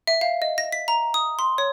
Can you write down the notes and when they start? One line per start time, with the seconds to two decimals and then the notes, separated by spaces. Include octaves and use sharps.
0.07 E5
0.21 F5
0.42 D#5
0.58 A#6
0.72 B6
0.88 A#5
1.14 D#6
1.39 C6
1.58 C#5